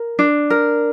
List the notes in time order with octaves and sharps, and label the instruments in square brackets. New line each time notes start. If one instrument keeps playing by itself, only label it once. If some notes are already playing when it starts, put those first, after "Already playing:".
Already playing: [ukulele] A#4
D4
A#4